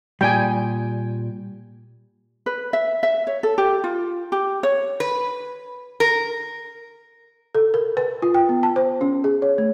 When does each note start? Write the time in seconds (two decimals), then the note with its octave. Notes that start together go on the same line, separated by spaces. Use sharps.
0.21 A#2 G3 G5 G#5
2.46 B4
2.73 E5
3.03 E5
3.27 C#5
3.43 A4
3.58 G4
3.84 F4
4.32 G4
4.63 C#5
5.00 B4
6.00 A#4
7.55 A4
7.74 A#4
7.97 B4
8.22 F4
8.34 G5
8.49 B3
8.63 A5
8.76 C5
9.01 C#4
9.24 G#4
9.42 C#5
9.58 A3